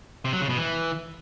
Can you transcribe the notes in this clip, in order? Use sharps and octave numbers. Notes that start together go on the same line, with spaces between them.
C3
F#3
C#3
B2
E3